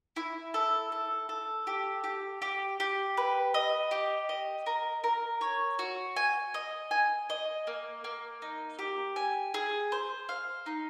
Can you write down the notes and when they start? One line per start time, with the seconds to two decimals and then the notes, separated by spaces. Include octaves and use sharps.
0.16 E4
0.54 A4
0.92 A4
1.29 A4
1.67 G4
2.04 G4
2.42 G4
2.80 G4
3.17 B4
3.54 D#5
3.91 G4
4.29 D#5
4.66 A#4
5.04 A#4
5.41 C#5
5.79 F#4
6.16 G#5
6.54 D#5
6.91 G#5
7.30 D#5
7.67 A#3
8.04 A#3
8.42 D#4
8.79 G4
9.16 G#5
9.54 G#4
9.92 C5
10.29 F5
10.66 D#4